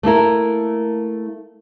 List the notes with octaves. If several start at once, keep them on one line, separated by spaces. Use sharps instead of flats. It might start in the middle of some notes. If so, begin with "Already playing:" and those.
A3 A#3 E4 A#4